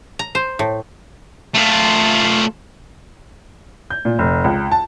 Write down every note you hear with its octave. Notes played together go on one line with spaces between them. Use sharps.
A#5
C5
A2
A3 F4
G6
A#2
F1
C#2
A5